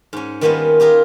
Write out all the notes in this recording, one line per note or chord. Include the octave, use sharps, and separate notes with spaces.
G#2 C#4
D#3 G3 A#3 B3 C#4 F4
F4 G4 G#4 A#4